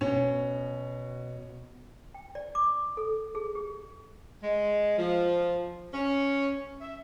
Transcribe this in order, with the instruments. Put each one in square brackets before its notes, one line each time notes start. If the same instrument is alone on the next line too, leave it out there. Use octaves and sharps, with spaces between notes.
[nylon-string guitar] B2 [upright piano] C#4
[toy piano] G5
D5
D6
A4
G#4
G4
[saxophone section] G#3
F3
C#4
E5